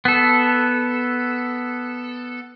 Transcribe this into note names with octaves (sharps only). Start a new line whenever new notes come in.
B3 A4